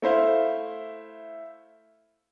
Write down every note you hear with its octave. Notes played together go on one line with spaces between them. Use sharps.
A3 E4 C5 F5